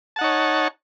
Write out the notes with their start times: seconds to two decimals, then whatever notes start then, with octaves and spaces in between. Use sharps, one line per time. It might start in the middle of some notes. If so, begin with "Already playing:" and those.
0.16 A5
0.19 F#5
0.21 D#4
0.24 C#5